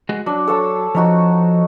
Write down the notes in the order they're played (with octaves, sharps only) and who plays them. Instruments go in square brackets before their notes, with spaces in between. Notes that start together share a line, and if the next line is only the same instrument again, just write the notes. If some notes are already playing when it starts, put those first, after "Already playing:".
[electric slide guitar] G#3 F#4 D#5
[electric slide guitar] F#3 F#4 [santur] D4
[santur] A4 C#5 A5
[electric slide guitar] F3 [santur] C#4 D#4 F#4